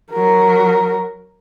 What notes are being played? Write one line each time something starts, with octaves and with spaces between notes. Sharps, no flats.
F#3 A#4